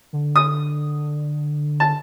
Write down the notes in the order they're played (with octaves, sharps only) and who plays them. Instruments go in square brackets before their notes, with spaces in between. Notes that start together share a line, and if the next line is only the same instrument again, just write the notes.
[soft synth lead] D3
[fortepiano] D#6
A5